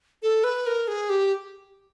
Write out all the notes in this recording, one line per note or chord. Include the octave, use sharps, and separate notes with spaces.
A4
B4
A#4
G#4
G4